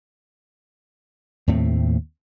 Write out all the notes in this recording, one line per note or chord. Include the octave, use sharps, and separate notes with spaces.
D#2 A2 A3 C4